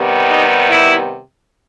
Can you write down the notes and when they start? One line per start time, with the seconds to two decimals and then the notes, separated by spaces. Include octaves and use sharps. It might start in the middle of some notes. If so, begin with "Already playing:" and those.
Already playing: C3 D#3 G3 B3
0.29 D#4
0.70 E4